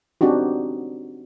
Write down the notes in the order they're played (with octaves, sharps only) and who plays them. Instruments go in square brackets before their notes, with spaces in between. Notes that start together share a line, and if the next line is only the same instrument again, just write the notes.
[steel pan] C4 D4 D#4 F#4 G4